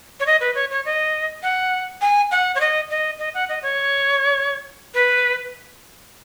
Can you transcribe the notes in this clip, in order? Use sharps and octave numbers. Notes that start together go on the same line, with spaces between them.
C#5
D#5
B4
C#5
C#5
D#5
F#5
G#5
F#5
C#5
D#5
D#5
D#5
F#5
D#5
C#5
B4